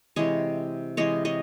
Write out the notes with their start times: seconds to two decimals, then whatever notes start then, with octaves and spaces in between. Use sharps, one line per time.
0.16 C3 E3 G#3 C#5 D#5
0.97 C3 E3 G#3 C#5 D#5
1.25 C#5 D#5